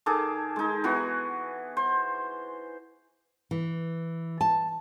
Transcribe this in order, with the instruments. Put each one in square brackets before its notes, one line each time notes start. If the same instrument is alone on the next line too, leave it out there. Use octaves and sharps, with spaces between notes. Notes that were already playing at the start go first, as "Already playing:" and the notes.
[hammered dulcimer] D#3 G#4 A4 D6
G#3 D#4
E3 B3 F#4
C5
[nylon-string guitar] E3
A5